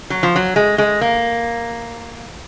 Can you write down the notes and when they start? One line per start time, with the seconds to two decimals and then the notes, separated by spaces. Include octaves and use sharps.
0.10 F#3
0.23 F3
0.36 F#3
0.56 G#3
0.78 G#3
1.01 A#3